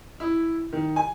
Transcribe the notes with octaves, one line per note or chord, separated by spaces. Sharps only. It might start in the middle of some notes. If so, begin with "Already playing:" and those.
E4
D#3
G#5